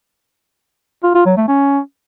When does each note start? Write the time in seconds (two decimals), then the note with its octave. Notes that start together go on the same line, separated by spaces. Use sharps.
1.03 F4
1.14 F4
1.26 F#3
1.37 A3
1.48 C#4